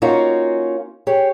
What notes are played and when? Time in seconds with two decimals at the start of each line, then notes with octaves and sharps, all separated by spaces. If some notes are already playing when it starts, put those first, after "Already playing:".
0.02 A#3 C#4 D#4 F4 F#4
1.07 G4 G#4 C#5